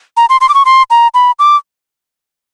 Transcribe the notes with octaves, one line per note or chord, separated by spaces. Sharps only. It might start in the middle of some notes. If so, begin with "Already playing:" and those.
A#5
C6
C6
D6
C#6
C6
A#5
B5
D6